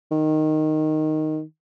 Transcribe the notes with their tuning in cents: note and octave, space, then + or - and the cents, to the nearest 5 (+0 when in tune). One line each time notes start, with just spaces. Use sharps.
D#3 -5